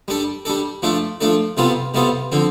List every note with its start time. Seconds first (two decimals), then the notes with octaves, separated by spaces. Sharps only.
0.08 G3 D4 A4
0.45 G3 D4 A4
0.82 F3 A3 D4 A4
1.21 F3 A3 D4 A4
1.57 C3 G3 B3 F4 A4
1.94 C3 G3 B3 F4 A4
2.32 D3 F3 C4